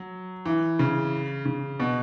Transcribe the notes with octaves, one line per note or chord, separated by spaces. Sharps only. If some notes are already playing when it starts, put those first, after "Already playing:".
Already playing: F#3
E3
C#3
C#3
B2